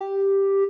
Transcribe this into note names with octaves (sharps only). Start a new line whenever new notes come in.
G4